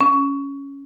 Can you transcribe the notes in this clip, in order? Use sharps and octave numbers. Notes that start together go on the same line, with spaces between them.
C#4